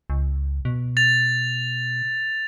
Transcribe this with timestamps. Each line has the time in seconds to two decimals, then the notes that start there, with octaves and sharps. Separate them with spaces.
0.10 C#2
0.65 B2
0.97 A6 F7